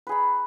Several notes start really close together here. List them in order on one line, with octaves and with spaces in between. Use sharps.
B4 G#4 B5